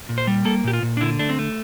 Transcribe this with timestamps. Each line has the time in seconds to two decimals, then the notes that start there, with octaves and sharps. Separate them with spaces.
0.09 A#2
0.18 C5
0.27 G3
0.45 A#3 A4
0.64 A#2 G4
0.73 F4
0.82 A#2
0.97 D4
1.01 D3 E4
1.19 A3 D4
1.29 C4
1.39 A3